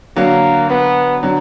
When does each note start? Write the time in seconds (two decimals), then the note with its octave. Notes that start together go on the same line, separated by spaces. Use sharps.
0.16 D3 F#3 A#3
0.70 B3
1.23 D3 F#3